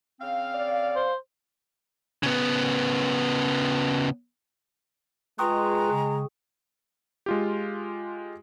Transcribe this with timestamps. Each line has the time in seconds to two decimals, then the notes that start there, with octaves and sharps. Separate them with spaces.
0.20 C#3 C4 F5
0.55 D5
0.96 C5
2.23 C#3 B3
5.39 G#3 F4 B4 G5 A#5 C#6 D#6
5.90 C#3
7.26 G#3 F4 G4